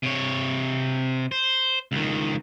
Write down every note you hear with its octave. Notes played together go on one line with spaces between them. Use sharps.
C3 C#5
C5
C#2 D#3